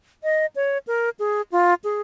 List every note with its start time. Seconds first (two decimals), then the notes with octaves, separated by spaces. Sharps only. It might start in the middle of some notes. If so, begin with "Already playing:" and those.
0.24 D#5
0.56 C#5
0.87 A#4
1.19 G#4
1.52 F4
1.84 G#4